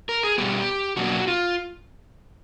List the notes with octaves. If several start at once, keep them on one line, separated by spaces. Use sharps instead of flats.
A#4
G#4
B2 G3 B3 G4
B2 F#3 A#3 D4 F#4
F4